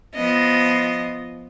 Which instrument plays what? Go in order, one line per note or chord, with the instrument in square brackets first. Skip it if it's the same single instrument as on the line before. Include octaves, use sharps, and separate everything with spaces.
[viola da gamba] F3 B3 D#5